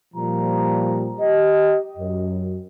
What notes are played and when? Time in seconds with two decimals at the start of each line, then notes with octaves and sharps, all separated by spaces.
0.15 A#2 F3 G3 A#5
1.20 G4 D#5
1.98 F#2